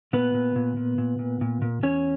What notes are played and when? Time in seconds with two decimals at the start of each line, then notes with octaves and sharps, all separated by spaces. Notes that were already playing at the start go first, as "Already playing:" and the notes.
0.13 A#2 B3 B4
0.34 A#2
0.56 A#2
0.77 A#2
0.98 A#2
1.19 A#2
1.41 A#2
1.62 A#2
1.83 E2 C#4 C#5